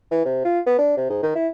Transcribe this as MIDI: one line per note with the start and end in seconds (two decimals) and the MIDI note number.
0.11 0.23 52
0.25 0.42 48
0.44 0.59 65
0.66 0.76 59
0.78 0.93 62
0.96 1.09 48
1.09 1.18 44
1.23 1.34 51
1.35 1.48 64